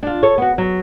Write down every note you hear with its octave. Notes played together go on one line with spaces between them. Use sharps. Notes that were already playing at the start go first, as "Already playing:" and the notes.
D4 F4
A4 C#5
B3 F#4
F#3